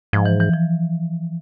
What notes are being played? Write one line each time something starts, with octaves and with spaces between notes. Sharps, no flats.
G#2 F3
E3
E3
F3